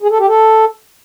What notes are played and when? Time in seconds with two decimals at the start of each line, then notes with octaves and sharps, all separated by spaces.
0.02 G#4
0.11 A4
0.19 G4
0.28 A4